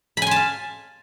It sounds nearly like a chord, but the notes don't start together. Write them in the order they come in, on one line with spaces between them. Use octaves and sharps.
B5 G#5 C6 A5 F5